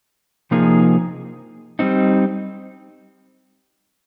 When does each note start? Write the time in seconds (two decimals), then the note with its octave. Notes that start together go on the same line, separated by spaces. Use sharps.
0.51 C3 F3 A#3 D#4 G#4
1.79 G3 C4 D#4